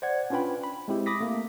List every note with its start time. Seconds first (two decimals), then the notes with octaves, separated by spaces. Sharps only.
0.02 C5 D5 F#5 G#6
0.30 C#4 D4 F4 B4 G5 B5
0.63 B5
0.88 G#3 C4 E4 G4
1.06 B5 D6 D#6 A#6 B6
1.20 A3 A#3